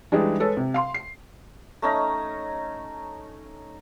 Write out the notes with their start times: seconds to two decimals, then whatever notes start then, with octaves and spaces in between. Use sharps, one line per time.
0.12 E3 G3 G#3 D4 D#4 G#4
0.40 G#3 A4 B4 C#5
0.57 C3
0.74 F5 C6
0.94 C7
1.82 A3 C#4 D#4 A#5